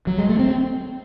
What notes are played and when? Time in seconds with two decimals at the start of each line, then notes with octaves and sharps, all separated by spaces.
0.07 F#3
0.18 G#3
0.29 A3
0.39 C4